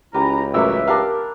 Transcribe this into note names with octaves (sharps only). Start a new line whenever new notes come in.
C#2 C#4 E4 G4 B4 A#5
A1 F#3 A#3 B4 E5 C#6 E6
D4 G4 A#4 F5